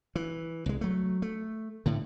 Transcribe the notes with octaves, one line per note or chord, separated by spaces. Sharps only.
E3
C2 G#3
F#3 A3
A3
A2 D3